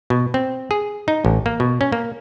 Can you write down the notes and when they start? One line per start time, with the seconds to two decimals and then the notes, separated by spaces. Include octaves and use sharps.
0.10 B2
0.34 C4
0.71 G#4
1.08 D#4
1.25 A1
1.46 A#3
1.60 B2
1.81 C#4
1.92 A#3